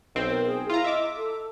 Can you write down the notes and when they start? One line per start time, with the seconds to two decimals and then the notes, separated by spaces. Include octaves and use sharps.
0.15 B1 C4
0.30 A#4
0.46 G#4
0.70 E4 F4 A#5
0.84 D#5 E5 D6
1.17 A4